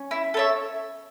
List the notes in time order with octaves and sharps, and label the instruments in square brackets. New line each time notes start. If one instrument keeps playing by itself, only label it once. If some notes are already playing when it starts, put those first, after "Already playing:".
Already playing: [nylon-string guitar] C#4
[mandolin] E4
A4 C#5 E5